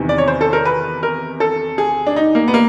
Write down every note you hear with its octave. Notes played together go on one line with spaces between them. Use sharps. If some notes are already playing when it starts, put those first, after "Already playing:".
Already playing: E2 C3 D#3
D5
C#5
C5
A4
A#4
B4
A#4
A4
G#4
D4
D#4
A#3
B3
A#3